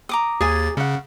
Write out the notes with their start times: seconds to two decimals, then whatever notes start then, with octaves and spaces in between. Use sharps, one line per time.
0.09 A#5 D6 D#6
0.41 D#2 G#4 G#5 A6
0.77 C#3 C#4 F#5